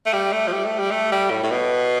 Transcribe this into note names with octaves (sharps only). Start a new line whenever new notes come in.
A3
G3
A3
F3
G3
A3
G3
A3
G3
A2
A2
B2